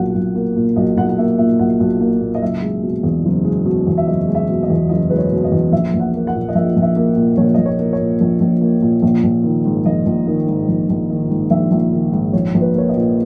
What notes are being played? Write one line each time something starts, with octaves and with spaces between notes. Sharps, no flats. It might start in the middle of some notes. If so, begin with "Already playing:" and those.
Already playing: B1 A#2 A#3 F#5
B1
A#3
A#2
B1 D#5
B1 F#5
F#5
A#3 E5
A#2 E5
B1 F#5
B1
A#3
A#2
D#5
F#1 E5
G#3
B2
E2
F#1
G#3
B2
E2
E5
F#1 D#5
G#3
E5
B2
D#5
E2
F#1 D#5
G#3 B4
C#5
B2
D#5
E2
A#1 E5
A#1
F#5
A#3
F#5
A#2
D#5
A#1 E5
A#1
E5
A#3
A#2
A#1 C#5
A#1 D#5
C#5
A#3
C#5
A#2
A#1
A#1
A#3
A#2
A#1
A#1
D#3
G#2
A#1 D#5
A#1
D#3
G#2
A#1
A#1
D#3
G#2
A#1 E5
A#1
D#3
G#2
A#1 C#5
A#1
B4
A#3 C#5
D#5
A#2